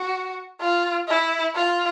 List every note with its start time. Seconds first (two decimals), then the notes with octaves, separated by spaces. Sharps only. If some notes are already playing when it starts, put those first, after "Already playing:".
Already playing: F#4
0.61 F4
1.08 E4
1.56 F4